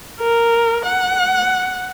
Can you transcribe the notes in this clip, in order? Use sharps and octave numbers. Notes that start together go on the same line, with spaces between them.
A#4
F#5